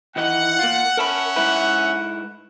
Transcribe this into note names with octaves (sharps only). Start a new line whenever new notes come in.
D#3 E3 D#5 F#5
A#3 F4
C#4 A#4 E5 F#5 A5 B5
G#2 E4 B4